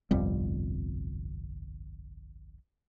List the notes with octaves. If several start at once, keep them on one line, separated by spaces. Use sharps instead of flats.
G1 C2 F2 G3